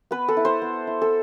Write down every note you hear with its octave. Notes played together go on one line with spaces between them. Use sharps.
B3 B4
A4
E4
C5
B3
E4
A4